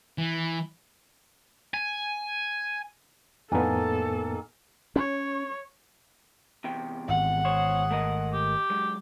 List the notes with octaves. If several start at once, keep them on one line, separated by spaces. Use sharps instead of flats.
E3
G#5
F2 A2 D#3 A#3 B3 A4 G#5
C#4 C#5
E2 C3 G5
G#1 G#2 F#5
E2 G#4 C5 C#5
A3 A#4 D#5
G4
D3 F#3 G#3